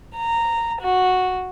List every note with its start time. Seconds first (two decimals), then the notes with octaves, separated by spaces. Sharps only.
0.16 A#5
0.81 F#4